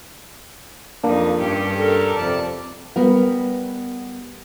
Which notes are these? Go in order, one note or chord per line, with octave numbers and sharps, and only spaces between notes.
F2 A#3 D4 D#4
G2 C#4 G4
A4 A#4
F2 C3 D5 A5
G3 B3 A#4 F5